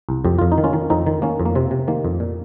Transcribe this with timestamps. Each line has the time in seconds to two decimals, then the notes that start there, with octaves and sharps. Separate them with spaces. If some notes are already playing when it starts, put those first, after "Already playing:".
0.09 C2
0.25 F2 G4
0.38 F2 F4
0.52 D#4
0.58 D#3
0.64 C#4 F4
0.73 D#3
0.90 F2 C4 D#4
1.06 D#3
1.22 D#3 A#3 C#4
1.40 F2
1.45 A#3
1.55 C3 C4
1.71 C3
1.88 D#3 A#3
2.05 F2
2.20 A#2